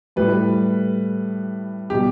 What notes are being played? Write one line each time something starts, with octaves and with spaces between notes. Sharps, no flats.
A2 G3 B4
B2 G3 G4